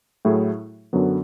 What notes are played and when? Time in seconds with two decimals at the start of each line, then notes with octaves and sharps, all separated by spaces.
0.25 A2 F#3 A3 E4 G#4
0.93 F#2 D3 F#3 B3